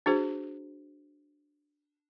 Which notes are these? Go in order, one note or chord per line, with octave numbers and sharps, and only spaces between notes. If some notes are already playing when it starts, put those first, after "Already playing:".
D4 F#4 G#4 C5